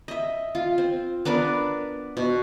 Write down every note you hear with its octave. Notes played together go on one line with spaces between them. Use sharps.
D#5 E5
F4
C4
B3 D4 A#4 B4
B2